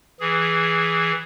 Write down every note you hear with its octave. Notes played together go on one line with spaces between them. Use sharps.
E3 G#4